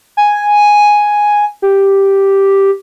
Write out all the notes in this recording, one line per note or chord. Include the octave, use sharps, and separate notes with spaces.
G#5
G4